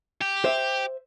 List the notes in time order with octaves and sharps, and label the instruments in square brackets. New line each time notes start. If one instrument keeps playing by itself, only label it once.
[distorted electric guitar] G4
[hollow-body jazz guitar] C5 E5